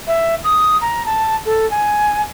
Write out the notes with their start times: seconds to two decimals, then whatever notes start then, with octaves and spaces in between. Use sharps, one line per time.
0.07 E5
0.44 D#6
0.81 A#5
1.06 A5
1.46 A4
1.70 G#5